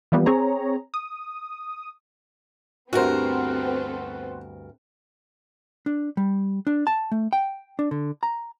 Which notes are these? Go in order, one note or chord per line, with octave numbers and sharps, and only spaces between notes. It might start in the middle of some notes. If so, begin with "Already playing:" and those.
E3 F3 G3 A#3 B3
C4 G#4 C#5 A#5
D#6
D2 G2 B3 C4 F#4 A4 A#4 C5
D4
G3
D4
A5
A3
G5
D4
D3
A#5